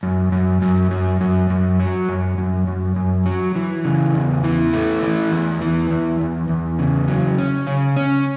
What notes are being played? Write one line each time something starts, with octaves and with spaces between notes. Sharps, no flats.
F#2
F#2
F#2
F#2
F#2
F#2
F#3
F#2
F#2
F#2
F#2
F#3
E3
C#3
E2
E3
A3
E3
E2
E3
E2
E2
E2
C#3
F#3
C#4
C#3
C#4